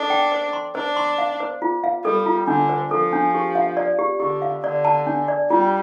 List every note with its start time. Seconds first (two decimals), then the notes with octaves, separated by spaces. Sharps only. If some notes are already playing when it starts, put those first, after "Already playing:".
Already playing: D4 A4
0.10 G5
0.32 C5
0.53 C6
0.75 D4 C5
0.96 C6
1.18 F5
1.40 C5
1.62 F4
1.84 F5
2.05 G3 A4
2.26 F4
2.47 D3 D4
2.69 C5
2.91 F3 A4
3.13 D4
3.34 G4
3.55 F5
3.77 D5
3.99 G4
4.20 D3 G4
4.42 F5
4.64 D3 D5
4.85 A5
5.07 D4
5.28 D5
5.50 G3 F4